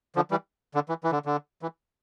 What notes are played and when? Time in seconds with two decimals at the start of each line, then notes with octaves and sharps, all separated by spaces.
0.16 D3 F3
0.31 E3 G3
0.75 D3
0.89 E3
1.04 E3
1.12 D3
1.25 D3
1.62 E3